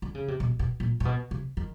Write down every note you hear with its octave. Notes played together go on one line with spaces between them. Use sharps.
D3
C#3
C3
B2
B2
A#2
A#2
B2
C3
D#3